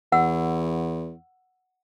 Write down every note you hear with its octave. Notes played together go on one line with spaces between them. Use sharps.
E2 F#5 E6